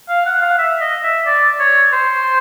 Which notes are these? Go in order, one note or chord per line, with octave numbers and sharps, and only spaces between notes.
F5
F#5
F5
E5
D#5
E5
D5
C#5
C5